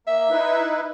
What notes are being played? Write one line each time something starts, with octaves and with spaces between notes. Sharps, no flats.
A#3 E5
D#4 E4 B4